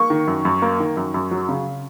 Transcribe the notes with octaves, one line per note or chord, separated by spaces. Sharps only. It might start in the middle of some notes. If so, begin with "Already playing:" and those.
Already playing: A#3 C#6
D#3
F#2
F#2
A#3
D#3
F#2
F#2
F#3
C#3